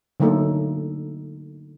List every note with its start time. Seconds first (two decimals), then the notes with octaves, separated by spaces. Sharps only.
0.20 D3 F#3 A3 A#3 D#4 A4